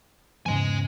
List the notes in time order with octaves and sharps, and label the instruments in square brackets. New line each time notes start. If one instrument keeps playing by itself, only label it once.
[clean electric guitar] E2 G#2 C#3 [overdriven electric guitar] D#5 G#5